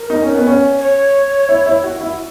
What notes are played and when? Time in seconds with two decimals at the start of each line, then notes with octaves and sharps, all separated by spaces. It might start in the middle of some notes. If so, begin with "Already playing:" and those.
Already playing: A#4
0.10 D#4
0.22 C#4
0.34 B3
0.47 C#4
0.79 C#5
1.49 E4
1.66 E4
1.84 F#4
2.01 E4